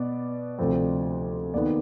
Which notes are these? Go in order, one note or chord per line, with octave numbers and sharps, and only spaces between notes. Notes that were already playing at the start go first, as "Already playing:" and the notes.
Already playing: B2 B3 D5
D2 C3 F3 C4
D#2 D#3 B3 D5